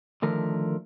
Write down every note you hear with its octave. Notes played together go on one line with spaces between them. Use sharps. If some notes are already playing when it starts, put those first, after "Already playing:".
D3 D#3 F3 A3 A#4